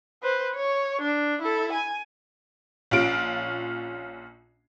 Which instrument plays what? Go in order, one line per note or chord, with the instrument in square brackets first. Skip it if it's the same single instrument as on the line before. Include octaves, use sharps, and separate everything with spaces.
[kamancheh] B4 C5
C#5
D4
E4 A4
G#5
[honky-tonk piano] A#1 C#4 F4 D7